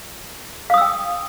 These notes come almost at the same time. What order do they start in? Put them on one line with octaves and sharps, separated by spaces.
F5 D#6 E6 G5